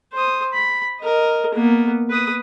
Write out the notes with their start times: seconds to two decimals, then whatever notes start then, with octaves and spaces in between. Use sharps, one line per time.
0.14 C5 D#6
0.53 B5
1.01 A#4 D#5
1.55 A#3 B3
2.10 B4 D#6